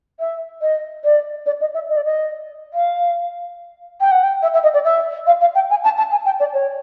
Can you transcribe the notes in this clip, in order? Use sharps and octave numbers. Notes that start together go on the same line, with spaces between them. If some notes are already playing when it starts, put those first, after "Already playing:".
E5
D#5
D5
D5
D#5
E5
D#5
D5
D#5
F5
G5
F#5
G5
E5
E5
D#5
D5
E5
F5
F5
G5
G#5
A5
A5
G#5
G5
D5
C#5